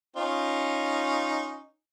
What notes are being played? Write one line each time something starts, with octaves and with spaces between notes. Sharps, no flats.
C#4 D#4 F4